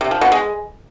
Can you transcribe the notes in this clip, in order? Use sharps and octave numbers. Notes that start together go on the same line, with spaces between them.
C3
F3
B2
G#3